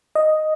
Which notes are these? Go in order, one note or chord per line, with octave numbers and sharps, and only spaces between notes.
D#5